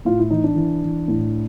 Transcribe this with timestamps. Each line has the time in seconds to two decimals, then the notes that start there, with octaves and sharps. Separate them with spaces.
0.05 A2 F4
0.19 E4
0.31 E3 D#4
0.44 D4
0.56 E3
0.83 E3
1.08 A2